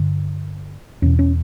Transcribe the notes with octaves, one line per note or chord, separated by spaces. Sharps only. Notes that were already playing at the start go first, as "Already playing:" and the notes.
Already playing: G2 D3
E2 B2 C#4
C#4